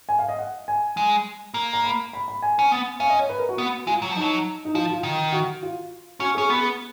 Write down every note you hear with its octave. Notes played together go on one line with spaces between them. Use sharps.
G#5
F5
D#5
F#5
G#5
G#3
A#3
A#5
B5
B5
B5
G#5
C#4
B3
C#4 F5
D#5
C#5
B4
A#4
F#4
B3
G#3 F4
F#3
F3
F#3 D#4
D#4
F3 F4
F4
D#3
F#4
F4
C#4 F#4
G#4
C#4
B3 G#4